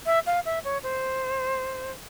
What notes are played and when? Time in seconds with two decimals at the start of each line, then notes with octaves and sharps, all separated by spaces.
0.06 E5
0.26 F5
0.45 E5
0.64 C#5
0.83 C5